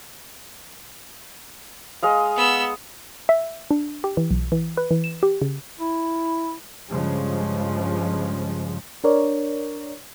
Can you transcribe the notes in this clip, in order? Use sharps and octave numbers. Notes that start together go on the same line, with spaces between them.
G#3 D#5 F5
B3 E6
E5
D4
G4
E3
B1
E3
B4
E3
E7
G4
C#3
E4
G2 C#3 F3 G#3
D4 A#4 C#5 D5